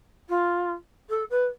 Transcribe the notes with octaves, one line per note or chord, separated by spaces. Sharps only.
F4
A4
B4